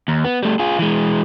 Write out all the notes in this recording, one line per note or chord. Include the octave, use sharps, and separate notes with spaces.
D#2
B3
G3 A3
F4 G#4
E3 G#3